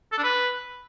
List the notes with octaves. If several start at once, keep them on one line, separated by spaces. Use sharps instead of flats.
A4
D4
B4